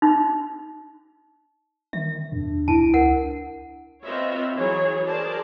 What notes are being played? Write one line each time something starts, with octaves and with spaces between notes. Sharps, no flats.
D#4
D#3 E5
E2 D4
C#2 E4 A5 D7
A#4 F#5
C4 F4 B4 C#5 D#5 E5
E3 F#3 G#4 C#5
G#4 A#4 C5 D5 A5